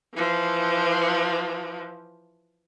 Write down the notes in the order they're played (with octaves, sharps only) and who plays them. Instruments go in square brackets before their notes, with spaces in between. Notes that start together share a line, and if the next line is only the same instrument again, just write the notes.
[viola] E3 F3